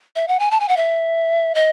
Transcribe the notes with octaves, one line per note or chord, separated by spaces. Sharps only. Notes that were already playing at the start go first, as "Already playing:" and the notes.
E5
F#5
G#5
A5
G#5
F#5
E5
D#5